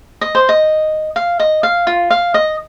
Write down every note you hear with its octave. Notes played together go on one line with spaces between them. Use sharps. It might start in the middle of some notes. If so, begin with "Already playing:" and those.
D#5
C5
D#5
F5
D#5
F5
F4
F5
D#5